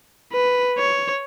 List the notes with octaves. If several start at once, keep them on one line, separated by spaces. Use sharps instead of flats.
B4
C#5